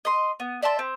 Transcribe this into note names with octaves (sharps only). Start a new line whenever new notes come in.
D#5 C6
B3
D5 E5 A5 C6
C4